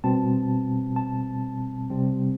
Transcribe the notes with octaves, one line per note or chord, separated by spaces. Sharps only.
B2 G3 C4 A5
A5
C3 G3 C4